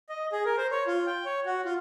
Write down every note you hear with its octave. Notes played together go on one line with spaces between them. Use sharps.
D#5
G#4
A#4
C5
C#5
F4
G5
C#5
F#4
F4